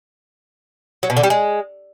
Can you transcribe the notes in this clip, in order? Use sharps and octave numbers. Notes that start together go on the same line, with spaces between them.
F#3
B2
D3
G3
G#3